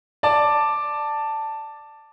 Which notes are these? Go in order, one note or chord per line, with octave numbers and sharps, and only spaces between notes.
D5 A5